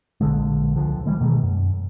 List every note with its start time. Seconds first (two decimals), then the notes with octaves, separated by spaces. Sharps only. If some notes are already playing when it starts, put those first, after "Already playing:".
0.21 A#1 D3 G#3
0.76 C#2 D3 F3
1.06 E3 G3 G#3 A#3
1.21 B2 D#3 E3 G#3
1.43 F#2